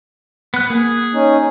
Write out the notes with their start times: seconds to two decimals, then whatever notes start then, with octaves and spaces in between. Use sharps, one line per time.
0.54 B3 F#6
0.70 A#3 G#4
1.14 C#4 D#4